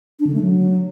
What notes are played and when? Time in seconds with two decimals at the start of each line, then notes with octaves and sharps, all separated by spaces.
0.20 D4
0.27 D3
0.34 A3
0.41 F#3